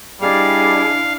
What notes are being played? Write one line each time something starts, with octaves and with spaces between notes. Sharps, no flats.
G3 D4 E4 G#4 D5 D#5 F5